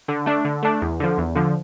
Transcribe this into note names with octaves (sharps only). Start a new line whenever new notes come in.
D3
A3 D4
D3
A3 D4
E2
D3 F3
E2
D3 F3